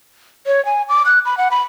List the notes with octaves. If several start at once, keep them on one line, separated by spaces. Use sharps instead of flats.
C#5
G#5
D6
F#6
B5
F#5
B5